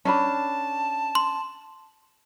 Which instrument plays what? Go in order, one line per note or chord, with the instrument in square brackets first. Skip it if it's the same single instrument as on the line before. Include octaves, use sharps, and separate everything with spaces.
[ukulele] C#4 D4 B5 [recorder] A5
[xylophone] C6